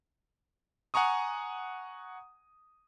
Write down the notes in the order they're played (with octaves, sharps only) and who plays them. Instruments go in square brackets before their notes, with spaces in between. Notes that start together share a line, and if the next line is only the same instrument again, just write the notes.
[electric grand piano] F#5 G#5 A#5 C#6 D#6